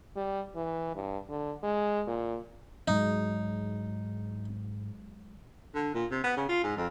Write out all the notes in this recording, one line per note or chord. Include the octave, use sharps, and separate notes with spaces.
G3
E3
G2
D3
G#3
A#2
G#2 F#3 G#3 D#4
D3
A#2
C3
B3
C#3
F4
G#2
F2